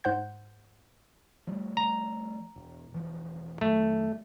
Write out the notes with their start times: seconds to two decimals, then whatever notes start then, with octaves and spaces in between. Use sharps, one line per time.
0.04 G#2 C5 F#5 G6
1.47 F3 G3 A3
1.77 A#5
2.56 E1
2.92 E1 E3 F3
3.61 F2 D#3 F#3 A3